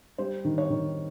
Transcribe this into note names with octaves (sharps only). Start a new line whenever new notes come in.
G3 C5
D#3
C#5
D#3